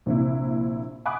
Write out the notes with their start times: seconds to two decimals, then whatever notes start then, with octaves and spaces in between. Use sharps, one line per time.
0.06 A#1 C3 E4
1.05 F#5 G#5 B5 D6 D#6 F#6